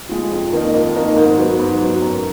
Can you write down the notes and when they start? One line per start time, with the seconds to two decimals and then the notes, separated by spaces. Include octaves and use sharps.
0.09 F3 G#3
0.31 F2
0.52 D#3 A#3 D#4
0.74 F2
0.95 D#3 A#3 D#4
1.16 G#2
1.38 F#3 B3
1.59 G#2
1.81 F#3 B3
2.02 F#2